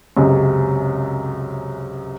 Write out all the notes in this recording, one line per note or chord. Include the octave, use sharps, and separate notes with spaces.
C#2 F#2 C3